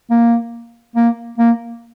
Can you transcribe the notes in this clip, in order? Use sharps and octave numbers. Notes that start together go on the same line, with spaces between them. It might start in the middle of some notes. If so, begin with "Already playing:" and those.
A#3
A#3
A#3